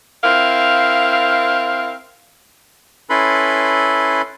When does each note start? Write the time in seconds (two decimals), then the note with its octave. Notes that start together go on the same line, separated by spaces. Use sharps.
0.24 C4 E4 A#4 F5
3.10 C#4 E4 A4 B4 B5 C6